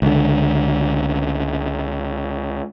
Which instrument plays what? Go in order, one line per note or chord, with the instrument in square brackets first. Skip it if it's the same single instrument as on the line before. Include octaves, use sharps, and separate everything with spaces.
[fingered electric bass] C#2 D3